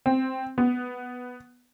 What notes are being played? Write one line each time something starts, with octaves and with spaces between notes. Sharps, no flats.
C4
B3